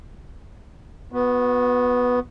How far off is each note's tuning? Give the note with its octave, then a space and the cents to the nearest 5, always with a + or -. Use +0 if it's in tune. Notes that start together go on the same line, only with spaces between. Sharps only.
B3 +0 F#4 -30